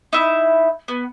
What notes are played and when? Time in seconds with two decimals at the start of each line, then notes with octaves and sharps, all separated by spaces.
0.13 D#4 E4 E5
0.88 B3